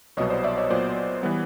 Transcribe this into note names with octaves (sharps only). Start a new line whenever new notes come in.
C2 B2 F#3 B3 C#5 D#5
C5 D5
D5 E5
C#5 D#5
A#2 F#3 B3 C5 D5
E3 G3 B3